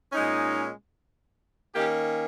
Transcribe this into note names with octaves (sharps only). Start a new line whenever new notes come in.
A#2 G#3 C#4 D#4
D#3 A#3 C#4 G4